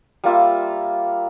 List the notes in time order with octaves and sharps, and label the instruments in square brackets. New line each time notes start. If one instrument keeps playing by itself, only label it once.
[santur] G3 A#3 F4 E5